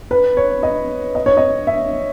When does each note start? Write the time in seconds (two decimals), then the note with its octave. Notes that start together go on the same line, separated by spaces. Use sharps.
0.11 B4
0.37 C#5
0.63 D#5
1.15 D#5
1.26 C#5
1.37 D#5
1.67 E5